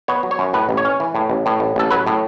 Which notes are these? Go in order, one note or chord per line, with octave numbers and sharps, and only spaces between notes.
B3 C#5
F#3
C#5
F#2
A2 B4
A1
C#5
C#4
E3
A2
A1
A2
A1
A1 A4
F#3 B4
A2